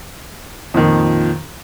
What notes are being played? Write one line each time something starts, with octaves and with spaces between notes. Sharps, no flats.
F2 A#2 D#3